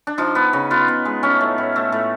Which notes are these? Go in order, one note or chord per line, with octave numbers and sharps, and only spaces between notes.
D4
F3 D#4
B3
C#3
B3 F4
B3
G#3
A3 C#4
A2
A2
A3
A2